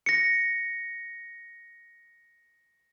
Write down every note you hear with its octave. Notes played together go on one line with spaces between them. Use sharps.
A#6 C#7